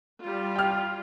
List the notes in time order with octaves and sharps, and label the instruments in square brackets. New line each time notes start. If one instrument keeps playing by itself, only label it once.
[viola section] G3 F4
[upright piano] G5 F6